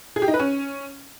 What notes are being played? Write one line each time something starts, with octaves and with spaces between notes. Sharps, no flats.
G#4
G4
D#4
B4
C#4